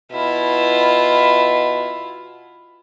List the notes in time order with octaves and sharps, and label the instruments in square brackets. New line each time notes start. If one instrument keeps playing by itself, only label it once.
[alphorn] B2 [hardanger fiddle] E4 F4